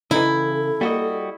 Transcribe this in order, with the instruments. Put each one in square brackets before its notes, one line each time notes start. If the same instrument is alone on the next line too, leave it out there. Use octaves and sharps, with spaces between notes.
[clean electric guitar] C#3 [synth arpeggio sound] E3 D#4 [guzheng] E4 [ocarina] A4
[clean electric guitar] G3 F#4 D#5 [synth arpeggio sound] A#3